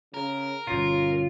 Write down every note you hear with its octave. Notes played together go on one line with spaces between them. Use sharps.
C#3 A#4
G1 B2 C#4 F4